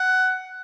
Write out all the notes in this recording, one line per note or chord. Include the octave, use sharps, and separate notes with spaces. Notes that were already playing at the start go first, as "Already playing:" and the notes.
Already playing: F#5